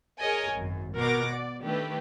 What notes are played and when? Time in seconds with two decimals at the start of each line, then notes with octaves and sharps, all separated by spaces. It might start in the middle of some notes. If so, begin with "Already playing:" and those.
0.21 G#4 A#4 C#5 D#5 G#5
0.54 G#1 F#2
0.95 B2 A#4 F#5 D6 A#6
1.33 D5
1.63 D#3 A3 D4 G4 B4